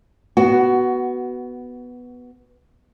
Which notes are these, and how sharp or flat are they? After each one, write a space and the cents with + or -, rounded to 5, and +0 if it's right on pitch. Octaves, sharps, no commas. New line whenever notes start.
B3 +0 F#4 +15